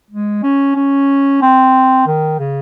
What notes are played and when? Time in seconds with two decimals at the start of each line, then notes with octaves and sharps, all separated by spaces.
0.11 G#3
0.43 C#4
0.76 C#4
1.42 C4
2.07 D#3
2.39 C#3